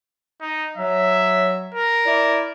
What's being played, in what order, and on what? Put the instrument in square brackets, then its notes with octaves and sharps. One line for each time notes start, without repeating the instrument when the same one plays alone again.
[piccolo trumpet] D#4
[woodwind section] F#3 [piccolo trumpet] E5
[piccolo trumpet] A#4
[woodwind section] E4 D5